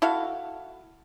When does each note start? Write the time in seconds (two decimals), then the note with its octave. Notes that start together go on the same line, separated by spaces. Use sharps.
0.02 E4 F#4 A4 F5